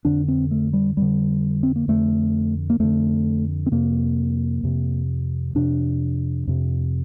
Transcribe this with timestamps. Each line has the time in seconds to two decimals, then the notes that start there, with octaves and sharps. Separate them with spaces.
0.05 F2 D3 D4
0.28 C4
0.51 A3
0.73 G3
0.97 F2 D3 G3
1.63 C4
1.76 A#3
1.88 F2 D3 A3
2.70 A#3
2.80 F2 D3 A3
3.66 C4
3.72 F2 C3 A#3
4.63 F2 C3
5.55 F2 C3 D4
6.47 F2 C3